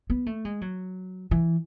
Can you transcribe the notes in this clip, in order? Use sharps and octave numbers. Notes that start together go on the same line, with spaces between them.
B3
A3
G#3
F#3
E3